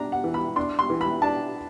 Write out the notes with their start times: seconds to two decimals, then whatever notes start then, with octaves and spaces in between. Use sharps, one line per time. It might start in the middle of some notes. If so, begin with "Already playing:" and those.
Already playing: D4 A#5
0.12 F#5
0.24 E3
0.34 B5
0.56 D4 C6
0.79 C6
0.90 E3
1.01 B5
1.22 D4 A5